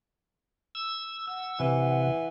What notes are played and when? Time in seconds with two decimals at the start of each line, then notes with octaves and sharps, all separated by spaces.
0.75 E6
1.27 F#5 E6
1.60 C3 E3